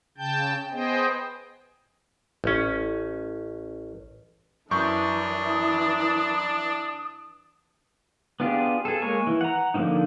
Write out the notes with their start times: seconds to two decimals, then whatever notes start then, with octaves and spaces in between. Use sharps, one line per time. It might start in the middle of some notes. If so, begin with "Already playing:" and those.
0.18 C#3 G5 A5 G6
0.71 B3 G#4 C5 D#5 G5
2.44 A1 C#4
4.71 F#2 E3 D4 C#6 D#6 G6
8.40 B3 D4 F4 G4 G#4
8.85 G#4 A4
9.02 G#3 A#3 A#4 C#5 G#5
9.27 E3
9.41 F#5 A#5
9.74 D3 F3 A#3 C4 D#4